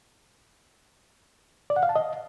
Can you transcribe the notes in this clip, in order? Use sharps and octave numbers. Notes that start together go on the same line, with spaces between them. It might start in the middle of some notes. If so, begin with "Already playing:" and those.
D5
F#5
F5
A5
D#5